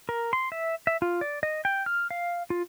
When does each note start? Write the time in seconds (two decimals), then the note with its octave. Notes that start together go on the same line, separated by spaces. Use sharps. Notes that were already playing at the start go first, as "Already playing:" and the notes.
0.09 A#4
0.33 C6
0.52 E5
0.87 E5
1.02 F4
1.21 D5
1.43 D#5
1.65 G5
1.86 F6
2.11 F5
2.50 F4